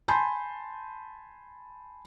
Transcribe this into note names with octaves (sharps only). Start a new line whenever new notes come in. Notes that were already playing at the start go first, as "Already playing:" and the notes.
G#5 A5 B5 C6 G6